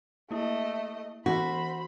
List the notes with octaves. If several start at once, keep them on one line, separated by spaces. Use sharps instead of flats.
A3 A#3 E4 D#5
E3 B3 F#4 C5 B5 B6